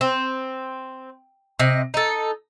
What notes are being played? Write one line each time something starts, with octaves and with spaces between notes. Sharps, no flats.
C4
C3 D#5
D#4 A4